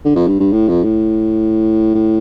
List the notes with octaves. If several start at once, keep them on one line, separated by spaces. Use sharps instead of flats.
D3
F2
G2
G2
A2
F2
A2
A2